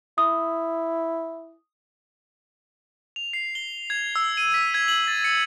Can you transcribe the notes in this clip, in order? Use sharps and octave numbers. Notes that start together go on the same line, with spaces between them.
E4 D#6
F7
C7
G7
G#6
E6
D#7
B6
G#6
F#7
A6
C#7